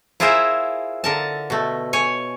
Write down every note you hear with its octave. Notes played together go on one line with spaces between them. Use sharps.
E4 F4 G#4 A#4 C5 E5
D3 A#4 A5
B2 A3
C#5 G#5